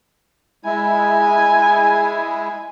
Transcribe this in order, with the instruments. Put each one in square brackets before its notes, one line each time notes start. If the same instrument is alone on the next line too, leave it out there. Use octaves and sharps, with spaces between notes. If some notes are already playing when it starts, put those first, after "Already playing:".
[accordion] G#3 E4 [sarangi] G#5